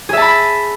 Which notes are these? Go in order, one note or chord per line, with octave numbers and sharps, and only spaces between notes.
G#4 E5 A5 B5